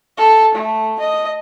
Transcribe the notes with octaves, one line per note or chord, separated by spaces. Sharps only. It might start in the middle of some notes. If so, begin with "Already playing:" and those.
A4
A3
D#5